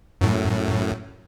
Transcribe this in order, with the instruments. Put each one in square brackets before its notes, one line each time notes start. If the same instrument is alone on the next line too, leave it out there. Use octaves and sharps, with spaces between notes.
[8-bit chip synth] F#2 A2